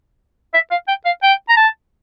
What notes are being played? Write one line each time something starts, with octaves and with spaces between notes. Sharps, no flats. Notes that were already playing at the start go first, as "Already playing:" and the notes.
E5
F5
G5
F5
G5
A#5
A5